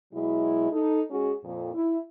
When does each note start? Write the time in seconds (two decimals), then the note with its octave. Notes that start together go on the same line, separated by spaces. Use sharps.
0.13 B2 F#3 G#3 E4
0.72 D#4 A4
1.11 G#3 C#4 F#4 G#4
1.43 F2 A#2
1.74 E4